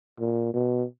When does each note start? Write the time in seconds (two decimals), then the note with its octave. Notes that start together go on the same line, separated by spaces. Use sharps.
0.20 A#2
0.54 B2